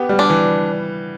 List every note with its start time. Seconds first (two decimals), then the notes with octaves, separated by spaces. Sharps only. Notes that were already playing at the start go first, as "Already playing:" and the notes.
Already playing: B3 G4
0.09 G3
0.19 D4
0.30 E3